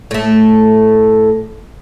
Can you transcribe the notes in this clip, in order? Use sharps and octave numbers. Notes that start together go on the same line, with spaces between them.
A2 A3